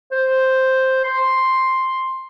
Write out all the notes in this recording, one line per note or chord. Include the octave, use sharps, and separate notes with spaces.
C5
C6